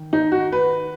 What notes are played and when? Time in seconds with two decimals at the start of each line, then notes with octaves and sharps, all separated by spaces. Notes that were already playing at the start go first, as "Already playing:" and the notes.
Already playing: D#3
0.13 D#4
0.32 F#4
0.52 B4